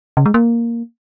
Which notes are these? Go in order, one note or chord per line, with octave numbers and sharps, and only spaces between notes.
C#3
G#3
A#3